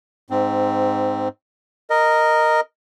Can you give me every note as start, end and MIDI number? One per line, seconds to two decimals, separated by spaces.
0.30 1.28 44
0.30 1.28 60
1.90 2.60 70
1.90 2.60 75